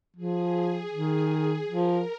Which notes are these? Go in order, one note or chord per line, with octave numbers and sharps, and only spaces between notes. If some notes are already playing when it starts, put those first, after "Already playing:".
F3 G#4
D#3
F3 A#4